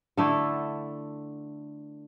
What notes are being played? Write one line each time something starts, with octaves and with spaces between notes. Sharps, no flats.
D3 A3 E4